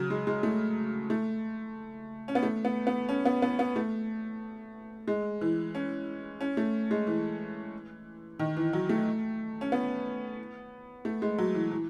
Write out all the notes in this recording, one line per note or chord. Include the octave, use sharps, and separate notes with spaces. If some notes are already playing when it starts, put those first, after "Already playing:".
Already playing: C#3 F#3
G#3
G#3
A3
A3
C#4
B3
A3
B3
B3
C#4
B3
B3
B3
A3
G#3
E3
C#4
C#4
A3
G#3
E3
D#3
E3
F#3
A3
C#4
B3
A3
G#3
F#3
E3
E3